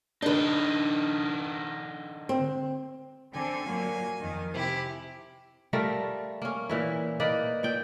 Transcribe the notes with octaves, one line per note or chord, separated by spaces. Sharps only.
D3 D4 D#4 B4
C4
D3 C4 G#5
A#2 F#3 A#3
F2 D#3
C3 E4 G4
G3 A3 F4 A#4
A#3 C#4
A#2 E3 E4
A#3 D#4 B4 D5
A#2 D5 G5